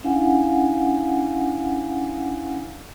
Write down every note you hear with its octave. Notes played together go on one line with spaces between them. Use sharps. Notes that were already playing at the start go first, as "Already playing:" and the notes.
C#4 D4 E4 F5 F#5 G#5